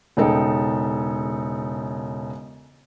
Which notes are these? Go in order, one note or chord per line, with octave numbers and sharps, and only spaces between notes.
E1 C#3 D#4 A4 G5